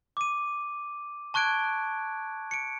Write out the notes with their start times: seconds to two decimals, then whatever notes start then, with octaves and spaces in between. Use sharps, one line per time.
0.17 D6 D#7
1.34 A5 C#6 F#6 G#6 D7
2.51 C#7 D7